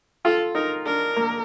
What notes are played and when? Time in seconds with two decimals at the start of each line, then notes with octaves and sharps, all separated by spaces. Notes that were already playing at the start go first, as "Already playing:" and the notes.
0.25 F4 A4
0.55 D#4 A#4
0.86 D4 A#4
1.16 A#3